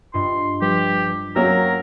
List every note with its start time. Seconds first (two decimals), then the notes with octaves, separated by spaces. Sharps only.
0.14 G2 F4 D#5 C6
0.62 F3 G3 G4 B4
1.36 F#3 A#3 C#4 F#4 A#4 G5 E6